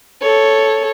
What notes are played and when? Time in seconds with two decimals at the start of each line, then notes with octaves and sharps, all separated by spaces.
0.22 A4 C#5